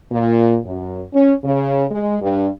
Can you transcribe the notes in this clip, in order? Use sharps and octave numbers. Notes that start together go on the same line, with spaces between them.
A#2
F#2
C#4
C#3
G#3
G2